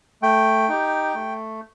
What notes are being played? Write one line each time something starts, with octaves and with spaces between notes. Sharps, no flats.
A3 G5
D#4 G4
A3